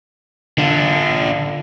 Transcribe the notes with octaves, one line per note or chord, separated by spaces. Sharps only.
D3 D4 F4